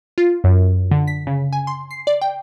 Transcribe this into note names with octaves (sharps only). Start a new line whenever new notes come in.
F4
F#2
D3
B6
C#3
G#5
C6
C7
D5
G5